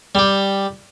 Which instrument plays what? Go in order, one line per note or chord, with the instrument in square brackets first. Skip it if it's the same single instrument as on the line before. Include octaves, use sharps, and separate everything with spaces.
[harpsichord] G3 G4